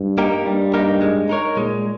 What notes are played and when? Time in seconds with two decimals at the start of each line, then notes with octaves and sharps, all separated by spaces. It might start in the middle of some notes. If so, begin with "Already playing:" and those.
Already playing: G2
0.18 A#3 D#4 G4 A#4
0.46 G2 G3
0.74 A#3 D#4 G4 A#4
1.02 G#3
1.29 D#4 A#4 C#5
1.57 A#2 G#3